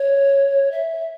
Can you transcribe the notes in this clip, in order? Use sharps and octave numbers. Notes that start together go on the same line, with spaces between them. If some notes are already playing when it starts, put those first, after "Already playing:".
Already playing: C#5
E5